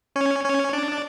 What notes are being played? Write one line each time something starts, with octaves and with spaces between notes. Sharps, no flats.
C#4 C#5
C#4 C#5
D4 D5
D5